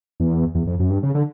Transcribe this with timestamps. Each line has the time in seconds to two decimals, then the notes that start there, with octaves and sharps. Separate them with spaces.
0.20 E2
0.55 E2
0.67 F2
0.79 F#2
0.90 G2
1.03 C#3
1.15 D3